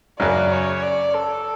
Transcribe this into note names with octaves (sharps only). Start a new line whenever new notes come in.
F#2 C#3 F#3 D5
C#5
D5
A4